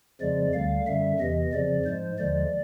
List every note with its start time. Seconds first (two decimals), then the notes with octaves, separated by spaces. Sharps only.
0.21 F2 C#3 F3 G#3 D5
0.53 D2 D3 G3 F5
0.87 F#2 D3 G3 E5
1.19 E2 C3 E3 D#5
1.52 F2 C#3 F3 D5
1.86 G#2 F3 G#3 C5
2.18 D#2 D3 F3 G#3 D5